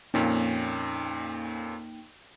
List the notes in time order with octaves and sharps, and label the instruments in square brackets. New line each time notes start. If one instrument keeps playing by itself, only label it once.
[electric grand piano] F2 A#2 C#4 [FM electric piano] A#3 D#4 G5